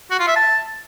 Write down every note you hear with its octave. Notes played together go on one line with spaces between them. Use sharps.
F#4
F4
E5
A5